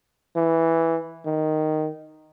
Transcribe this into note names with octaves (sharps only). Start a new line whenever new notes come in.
E3
D#3